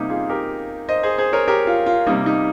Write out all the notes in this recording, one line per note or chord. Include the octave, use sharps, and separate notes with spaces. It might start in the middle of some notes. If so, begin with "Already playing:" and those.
Already playing: C3 G3 A#3 D#4 G4
F4 G#4
G4 A#4
C5 D#5
G#4 C5
G#4 C5
A#4 C#5
G4 A#4
F4
F4
C3 G3 A#3 D#4
D#4